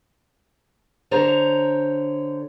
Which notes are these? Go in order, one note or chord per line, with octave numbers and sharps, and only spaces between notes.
D3 C5 C#5 A#5